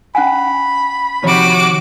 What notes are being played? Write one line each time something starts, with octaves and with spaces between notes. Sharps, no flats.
C#4 F#5 G#5 B5
C3 D#3 F3 F#4 C#5 D6